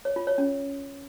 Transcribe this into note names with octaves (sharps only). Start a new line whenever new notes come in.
C#5
F4
C#5
C#4